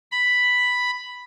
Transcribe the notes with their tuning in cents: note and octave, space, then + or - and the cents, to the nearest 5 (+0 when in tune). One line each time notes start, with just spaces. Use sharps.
B5 +0